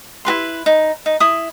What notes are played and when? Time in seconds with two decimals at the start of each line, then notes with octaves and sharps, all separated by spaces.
0.25 E4 F#4 B4 C6
0.66 D#4
1.06 D#4
1.20 E4 D#6